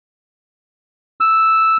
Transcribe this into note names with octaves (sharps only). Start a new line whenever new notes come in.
E6